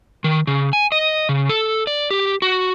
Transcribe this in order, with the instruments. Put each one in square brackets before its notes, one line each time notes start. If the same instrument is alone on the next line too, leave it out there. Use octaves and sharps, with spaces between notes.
[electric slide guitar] D#3
C#3
G#5
D#5
C#3
A4
D5
G4
F#4